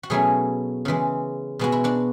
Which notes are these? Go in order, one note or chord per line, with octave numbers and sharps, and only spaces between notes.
F#4
B2 F#3 A3 C#4 E4 G#4
C#3 E3 G#3
B2 G#3 B3 F#4
E4
D4 F#4